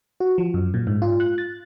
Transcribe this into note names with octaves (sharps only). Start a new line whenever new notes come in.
F#4
F3
F#2
A#2
G#2
F4
F#6
A6